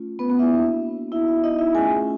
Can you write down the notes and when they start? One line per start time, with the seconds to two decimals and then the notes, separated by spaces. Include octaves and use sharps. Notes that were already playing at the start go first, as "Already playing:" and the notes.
Already playing: A3 C#4 F4
0.19 B3 B4
0.29 B3 B4
0.39 E4 E5
0.51 A#3 D4 F#4
1.12 B3 D#4 E4 F#4 E5
1.27 E4 E5
1.44 D#4 D#5
1.59 E4 E5
1.74 A3 C#4 F4 G#4 G#5